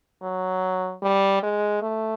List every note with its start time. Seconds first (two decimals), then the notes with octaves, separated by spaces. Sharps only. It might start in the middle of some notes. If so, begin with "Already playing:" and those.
0.22 F#3
1.03 G3
1.43 G#3
1.82 A3